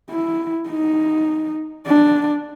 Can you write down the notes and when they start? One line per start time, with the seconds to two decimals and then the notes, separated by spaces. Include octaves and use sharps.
0.11 E4
0.69 D#4
1.86 D4